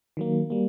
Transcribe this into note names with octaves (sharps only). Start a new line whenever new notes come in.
D#3 F#3 A#3
G3 A#3